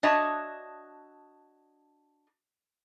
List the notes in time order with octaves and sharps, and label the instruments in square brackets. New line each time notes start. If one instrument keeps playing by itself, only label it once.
[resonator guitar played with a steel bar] D4 F#4 C#5 D#5 E5 A5